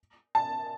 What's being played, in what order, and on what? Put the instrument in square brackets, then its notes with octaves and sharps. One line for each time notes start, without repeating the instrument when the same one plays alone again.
[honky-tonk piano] A5